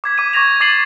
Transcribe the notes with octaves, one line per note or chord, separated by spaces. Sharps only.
D6 G#6 B6
D6 D#7
C#6 G#6 A#6 F7
D6 A6 C7 D#7 F#7